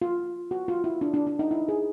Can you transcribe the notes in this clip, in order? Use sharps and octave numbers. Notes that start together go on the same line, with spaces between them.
F4
F#4
F4
E4
D4
D4
D4
D#4
E4
G#4